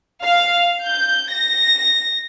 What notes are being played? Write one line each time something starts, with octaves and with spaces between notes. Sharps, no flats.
F5
G6
A#6